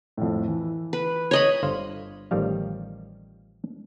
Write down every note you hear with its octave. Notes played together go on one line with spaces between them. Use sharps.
F2 A2
E3
B4
C#5 D#5 B5
G1 D3 C5 F5
A1 D#3 F3 G3 F5